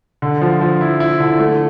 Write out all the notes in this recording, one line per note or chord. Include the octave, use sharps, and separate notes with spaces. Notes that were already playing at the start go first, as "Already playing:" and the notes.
D3
F3
F3
E4
E4
D3
A3